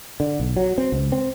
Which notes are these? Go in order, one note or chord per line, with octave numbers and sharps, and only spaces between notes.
D3
B1
F#3
C4
C#2
C4